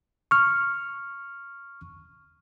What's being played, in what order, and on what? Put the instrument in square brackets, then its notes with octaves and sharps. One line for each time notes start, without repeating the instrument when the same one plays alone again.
[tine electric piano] C#6 F6